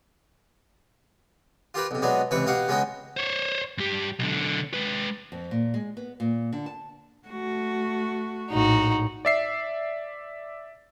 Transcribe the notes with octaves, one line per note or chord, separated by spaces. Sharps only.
F4 G4 A#4 B4
B1 C3
B2 F#3 G#3 B3 D4
C#2 C3 E3 B4 C#6
B2 G4 F5 F#5 C#6
C#2 G#3 B3 C#4 F#4 G5
C5 C#5
G2 G4
B1 D3
G#3 B4
F2
A#2
G#3
B3
A#2
D3
A5
A3 F#4
A#1 A2 D#4 F#4
D5 E5 C7